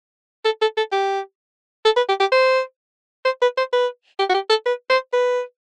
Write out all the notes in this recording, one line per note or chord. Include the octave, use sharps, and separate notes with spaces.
A4
A4
A4
G4
A4
B4
G4
G4
C5
C5
B4
C5
B4
G4
F#4
G4
A4
B4
C5
B4